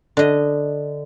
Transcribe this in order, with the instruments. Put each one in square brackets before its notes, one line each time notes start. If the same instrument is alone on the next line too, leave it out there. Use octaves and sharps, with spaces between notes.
[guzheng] D3 D#5